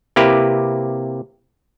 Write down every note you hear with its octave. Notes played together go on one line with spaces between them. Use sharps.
C3 A#3 E4 G4 B4